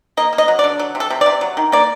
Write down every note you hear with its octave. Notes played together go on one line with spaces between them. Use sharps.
A#3 D#5
A#3
D#5
F#3
D5
D3
F#3
C3
A4
C3
D5
C3
F#3
D#3
A#3 D5